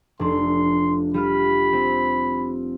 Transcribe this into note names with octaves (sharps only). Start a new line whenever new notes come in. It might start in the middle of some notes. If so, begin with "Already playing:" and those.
F1 D4 C6
G3 F4 B5 F6
C4